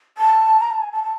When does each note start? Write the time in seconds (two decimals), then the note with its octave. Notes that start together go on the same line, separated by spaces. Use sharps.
0.18 A5
0.60 A#5
0.71 A5
0.82 G#5
0.92 A5
1.04 A5